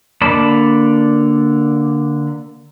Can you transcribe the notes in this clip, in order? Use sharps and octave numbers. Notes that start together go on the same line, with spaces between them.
D3 A#3 D5 A5 B5